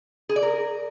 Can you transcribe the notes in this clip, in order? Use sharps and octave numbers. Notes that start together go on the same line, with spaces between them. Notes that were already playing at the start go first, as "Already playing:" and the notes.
G#4
D5
A#4